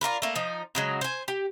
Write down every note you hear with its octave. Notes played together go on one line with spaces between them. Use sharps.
D4 F4 A#4 B4
A3 A#3
F3 D#4
C#3 F#3 G#3
C5 G#5
G4